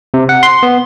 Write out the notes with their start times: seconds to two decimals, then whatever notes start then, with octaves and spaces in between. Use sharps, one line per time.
0.14 C3
0.29 F#5
0.43 C6
0.63 B3